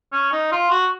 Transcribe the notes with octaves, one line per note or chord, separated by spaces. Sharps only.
C#4
D#4
F4
F#4